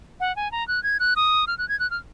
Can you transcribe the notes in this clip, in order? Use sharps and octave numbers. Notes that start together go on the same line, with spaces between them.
F#5
G#5
A#5
F#6
G#6
F#6
D#6
F6
F#6
G#6
F#6
F6